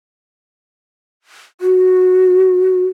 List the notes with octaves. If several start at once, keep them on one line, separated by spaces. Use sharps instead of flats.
F#4